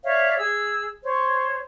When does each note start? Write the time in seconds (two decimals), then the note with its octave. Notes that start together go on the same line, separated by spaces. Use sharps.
0.04 C#5 D5 E5 F5
0.38 G#4 E6
1.02 C5 C#5